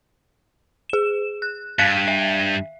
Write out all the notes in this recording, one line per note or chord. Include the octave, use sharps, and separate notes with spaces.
G#4 E7
F#6
G2 F5 F#6 B6
E5